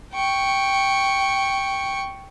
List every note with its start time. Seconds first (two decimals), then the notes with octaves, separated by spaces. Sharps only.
0.13 G5 C#6